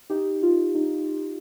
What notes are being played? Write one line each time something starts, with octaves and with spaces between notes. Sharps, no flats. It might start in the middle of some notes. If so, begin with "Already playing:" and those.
D#4 G4
F4
D#4